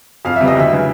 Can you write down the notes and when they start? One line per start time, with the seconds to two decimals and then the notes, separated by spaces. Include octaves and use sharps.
0.25 F2 F5
0.36 C3 E3 G3 E5
0.48 D#5
0.56 D2 E5
0.71 C#3 E3 G#3